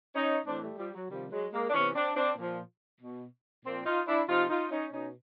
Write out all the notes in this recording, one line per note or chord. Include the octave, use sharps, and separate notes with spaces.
C#4 D#4
A2 E3 C4 D4
G3 A3
F3 G3
F#3
C3 D#3 F3 G3
F#3 G#3
G#3 A#3
D4
C3 E3 B3 C#4
C4 D4
C4 D4
A#2 F3
B2
A#2 F3 A#3 C4
D#4 F4
D4 E4
C3 F3 D#4 F4
D#4 F4
C#4 D#4
B2 C#4 D#4